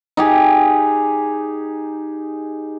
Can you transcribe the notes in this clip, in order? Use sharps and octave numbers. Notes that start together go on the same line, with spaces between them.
D#4 G4 G#4